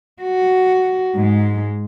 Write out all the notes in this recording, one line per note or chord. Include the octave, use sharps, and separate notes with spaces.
F#4
G#2 G#3